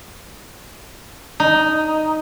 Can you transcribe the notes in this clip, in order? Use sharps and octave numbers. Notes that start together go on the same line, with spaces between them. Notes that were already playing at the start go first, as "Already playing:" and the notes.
D#4